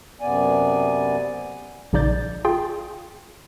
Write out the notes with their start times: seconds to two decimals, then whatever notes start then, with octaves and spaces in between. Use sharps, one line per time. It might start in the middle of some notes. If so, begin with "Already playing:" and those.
0.21 F#2 C3 B3 D5 G#5
1.93 A#1 C#3 D#4 D5 G6 A6
2.45 F4 G#4 G5